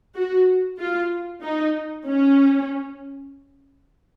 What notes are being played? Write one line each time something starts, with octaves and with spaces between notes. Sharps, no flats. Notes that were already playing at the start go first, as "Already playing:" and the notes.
F#4
F4
D#4
C#4